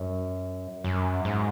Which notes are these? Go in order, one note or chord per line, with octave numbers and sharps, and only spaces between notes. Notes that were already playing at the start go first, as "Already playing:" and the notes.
Already playing: F#2
F#2
G#2